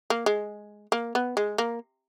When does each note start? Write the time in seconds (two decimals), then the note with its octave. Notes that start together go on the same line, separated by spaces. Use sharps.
0.10 A#3
0.26 G#3
0.92 A#3
1.15 B3
1.37 G#3
1.58 A#3